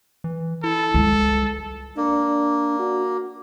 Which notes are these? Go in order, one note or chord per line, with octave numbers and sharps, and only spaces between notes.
E3
E4 A4
C#2 G3 G#3
A#3 D4
F#4